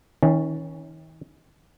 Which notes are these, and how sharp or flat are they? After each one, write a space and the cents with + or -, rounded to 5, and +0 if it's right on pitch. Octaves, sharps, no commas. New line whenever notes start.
D#3 +45 C#4 +0